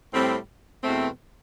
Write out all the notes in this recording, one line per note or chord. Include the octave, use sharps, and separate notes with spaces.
A2 G3 C4
E2 B2 A3 C4